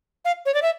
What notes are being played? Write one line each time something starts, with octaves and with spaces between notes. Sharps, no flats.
F5
C#5
D5
E5